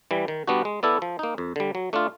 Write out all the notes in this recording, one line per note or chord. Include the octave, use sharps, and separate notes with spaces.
E3 G3
D#3
G3 B3 D4 F#4
G#3
B3 E4 A4 D5
F3
A#3 D#4
F2
D3 G3
F#3
A3 D4 F4